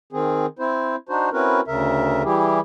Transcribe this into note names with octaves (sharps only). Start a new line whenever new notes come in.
D#3 C4 G#4
C4 E4 C5
D4 D#4 F#4 C5
C4 C#4 E4 F#4 A#4 B4
D2 C#3 A#4 E5
E3 G3 E4 G4 G#4